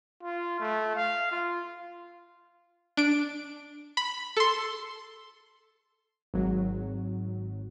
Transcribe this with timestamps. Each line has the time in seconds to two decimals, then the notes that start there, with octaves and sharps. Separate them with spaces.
0.23 F4
0.60 A3
0.96 F5
1.31 F4
2.97 D4 D7
3.97 B5
4.37 A4 C6
6.34 G#1 F#3